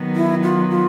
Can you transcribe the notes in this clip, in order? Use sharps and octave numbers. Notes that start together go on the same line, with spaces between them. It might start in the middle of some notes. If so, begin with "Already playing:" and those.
Already playing: D#3 F#3 B3
E4
F4
F4